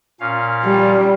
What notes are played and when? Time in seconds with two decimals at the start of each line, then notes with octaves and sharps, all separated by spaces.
0.20 A#2 C#4 F5
0.65 G3